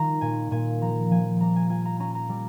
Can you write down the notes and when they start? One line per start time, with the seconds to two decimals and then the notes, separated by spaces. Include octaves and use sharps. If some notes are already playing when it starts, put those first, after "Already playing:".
Already playing: D#3 G3 F4 A#5
0.21 A#2 G#5
0.51 A#2 G#5
0.81 F3 A#5
1.10 F3 G#5
1.40 G3 A#5
1.56 G#5
1.69 F4 G#5
1.85 A#5
2.00 C#4 A#5
2.15 A#5
2.29 G3